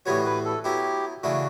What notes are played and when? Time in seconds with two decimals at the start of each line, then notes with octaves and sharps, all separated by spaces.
0.06 A2 E3 G3 B3 F#4 C#5
0.26 B4
0.45 A4
0.64 F#3 B3 E4 G4
1.23 C#3 E3 A3 D4 F#4